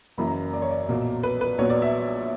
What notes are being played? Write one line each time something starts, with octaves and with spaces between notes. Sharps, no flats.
F#1 F#2 E3 A#3 B5
A#5
D5
C#5
D5
B1 A#2 F#3 A#3
B4
B4
A#1 A#2 F#3 B3 C#5
D5
E5